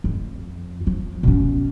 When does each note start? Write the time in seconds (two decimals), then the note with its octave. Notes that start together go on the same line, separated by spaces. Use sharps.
0.04 F2
0.87 F3
1.23 B2 C#4